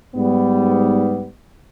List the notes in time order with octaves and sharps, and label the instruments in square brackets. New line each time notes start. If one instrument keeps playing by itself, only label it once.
[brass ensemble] G#2 G3 B3